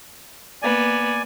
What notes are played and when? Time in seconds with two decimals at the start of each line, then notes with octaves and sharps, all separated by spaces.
0.62 A#3 B3 D5 G#5